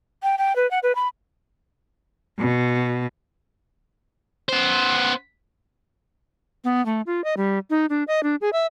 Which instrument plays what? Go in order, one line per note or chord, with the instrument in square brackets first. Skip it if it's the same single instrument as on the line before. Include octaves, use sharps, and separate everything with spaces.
[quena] G5
G5
B4
F#5
B4
B5
[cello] B2
[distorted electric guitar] B3 C5
[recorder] B3
A3
F4
D#5
G3
D#4
D4
D#5
D4
G#4
E5